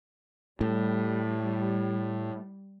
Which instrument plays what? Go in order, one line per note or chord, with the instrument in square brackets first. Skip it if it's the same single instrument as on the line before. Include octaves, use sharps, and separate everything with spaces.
[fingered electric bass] A2 [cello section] G3